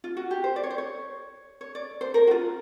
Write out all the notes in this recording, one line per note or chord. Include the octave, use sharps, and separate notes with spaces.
F4
F#4
G4
C5
D5
C#5
C5
C#5
C#5
D5
C5
A#4
F#4
F4